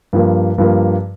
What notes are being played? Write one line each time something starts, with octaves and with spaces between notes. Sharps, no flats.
G2 F3 A#3
G2 F3 A#3